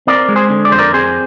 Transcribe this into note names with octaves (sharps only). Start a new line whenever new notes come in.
C4 A#4 D5
G#3
G#4 C5
D3
D5
F2 C5
A#4 D5
C4 G#4 C5